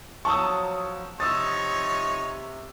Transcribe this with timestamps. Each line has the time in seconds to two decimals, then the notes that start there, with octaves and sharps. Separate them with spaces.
0.25 F3 F#3 A5 A#5 C#6 D#6 E6
1.20 C3 F3 D#4 C#5 D#6 E6 A6